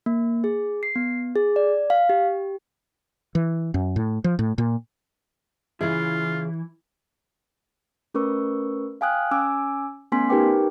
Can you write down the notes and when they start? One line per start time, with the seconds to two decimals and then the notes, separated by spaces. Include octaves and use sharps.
0.06 A#3
0.44 G#4
0.83 C7
0.96 B3
1.36 G#4
1.56 D5
1.90 F5
2.09 G4
3.35 E3
3.74 F#2
3.96 A2
4.24 F3
4.39 A2
4.58 A#2
5.81 C#3 E3 E4 F4 G#4
8.14 A3 C#4 A#4 B4 C#6 E6
9.01 F5 G5 G#5 D#6 F6 F#6
9.31 C#4 G#5 D6 E6
10.12 A3 B3 C#4 G#5 C6 B6
10.29 D#4 G4 A#4 B4 G5 D6